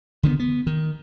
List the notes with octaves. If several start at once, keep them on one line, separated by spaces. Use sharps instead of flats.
D3 D#3 A#3 B3
B3
D#3